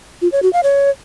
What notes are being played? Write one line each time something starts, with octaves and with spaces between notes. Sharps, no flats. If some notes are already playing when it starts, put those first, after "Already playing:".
F4
C#5
F#4
F5
C#5